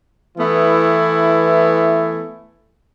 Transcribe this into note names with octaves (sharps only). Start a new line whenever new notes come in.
E3 A3 B3 E4